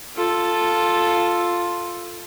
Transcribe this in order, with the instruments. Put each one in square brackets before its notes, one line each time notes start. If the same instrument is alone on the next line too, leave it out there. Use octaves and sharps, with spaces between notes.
[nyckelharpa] F4 A4